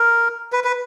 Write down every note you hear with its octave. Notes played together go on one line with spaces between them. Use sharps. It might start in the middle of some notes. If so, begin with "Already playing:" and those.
Already playing: A#4
B4
B4